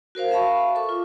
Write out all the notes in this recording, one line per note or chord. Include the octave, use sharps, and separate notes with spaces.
F#4 A#4 C5 F5
E5 F5 A5 B5 C#6
A4 C#6 D6
F4